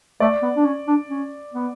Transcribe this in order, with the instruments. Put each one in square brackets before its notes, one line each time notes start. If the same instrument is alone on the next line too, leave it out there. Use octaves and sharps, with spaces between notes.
[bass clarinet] A3 [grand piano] D5
[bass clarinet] B3
D4
C#4
D4
C#4
B3